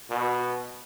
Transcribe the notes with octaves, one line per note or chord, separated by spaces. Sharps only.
B2